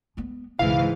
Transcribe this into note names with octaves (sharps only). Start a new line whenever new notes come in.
G#3 B3
C#2 G#2 B2 E3 E4 F5